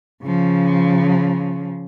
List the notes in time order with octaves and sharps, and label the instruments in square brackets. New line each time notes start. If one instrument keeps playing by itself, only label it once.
[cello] C#3 F3